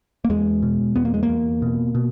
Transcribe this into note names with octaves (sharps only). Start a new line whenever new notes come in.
A#3
E2 G#3
B2
E2 B3
A#3
G#3
A#3
E2
B2
B2